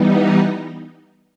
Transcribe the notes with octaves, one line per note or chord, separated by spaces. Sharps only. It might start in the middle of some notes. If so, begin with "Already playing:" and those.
Already playing: E3 G3 B3 D#4
D#5